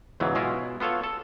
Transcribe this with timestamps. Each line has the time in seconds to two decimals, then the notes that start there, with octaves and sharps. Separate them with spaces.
0.20 E2 G#2 C#3 E3 F#3
0.35 B2 G#3 E4 F4
0.80 B3 F4 A4 C#5 F5
1.04 A4